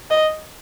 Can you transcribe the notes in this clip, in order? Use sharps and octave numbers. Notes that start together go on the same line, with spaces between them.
D#5